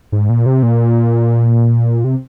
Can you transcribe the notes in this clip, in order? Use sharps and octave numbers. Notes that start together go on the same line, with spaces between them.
G#2
A#2
C3
A#2
C3